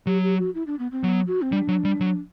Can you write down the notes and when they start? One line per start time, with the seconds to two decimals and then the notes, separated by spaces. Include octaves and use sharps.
0.07 F#3 G4
0.23 G4
0.39 F#4
0.55 E4
0.67 D4
0.79 B3
0.92 C4
1.04 F#3 B3
1.27 F#4
1.42 C4
1.52 G3 D4
1.68 F#3
1.85 G3
2.00 F#3